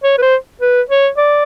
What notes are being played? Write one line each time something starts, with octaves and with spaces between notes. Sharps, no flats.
C#5
B4
C5
B4
C#5
D5